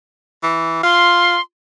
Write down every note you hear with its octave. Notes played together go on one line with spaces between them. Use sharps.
E3
F4 C6